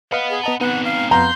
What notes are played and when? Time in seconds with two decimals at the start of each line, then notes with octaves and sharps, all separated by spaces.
0.12 B4 D#5 F5 F#5 B5
0.30 G#4
0.43 B3 D#5 A5 A#5
0.61 B3 C4 D#4 F#5
0.85 F5
1.11 F2 B3 F5 A#5 C6 G6